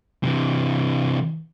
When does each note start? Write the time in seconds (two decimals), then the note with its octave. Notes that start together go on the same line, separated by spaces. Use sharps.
0.23 C3 E3